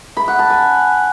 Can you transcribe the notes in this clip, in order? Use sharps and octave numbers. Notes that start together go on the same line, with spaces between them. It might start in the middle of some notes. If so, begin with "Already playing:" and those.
B5
F#5
A5
G#5